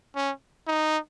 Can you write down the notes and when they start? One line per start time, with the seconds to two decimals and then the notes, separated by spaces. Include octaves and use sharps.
0.16 C#4
0.67 D#4